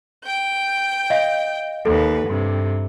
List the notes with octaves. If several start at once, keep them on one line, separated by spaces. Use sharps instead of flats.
G5 G6
D#5 F5
D#2 A4 B4
G2 C3